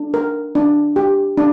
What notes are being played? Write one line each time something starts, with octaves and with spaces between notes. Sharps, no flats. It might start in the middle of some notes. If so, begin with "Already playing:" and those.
Already playing: D4
A#4
D4
G4
D4